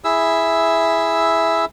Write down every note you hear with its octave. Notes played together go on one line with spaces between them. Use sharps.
E4 G#4 E5 E6